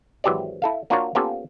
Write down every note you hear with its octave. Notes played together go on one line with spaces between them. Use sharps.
G#1 E3 F#3 G4 C5 D5
E4 A4 F5
A#3 D4 F4 F#4 A#4 C#5
A#3 B3 C#4 F4 G4 A4